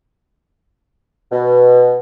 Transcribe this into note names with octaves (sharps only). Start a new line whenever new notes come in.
B2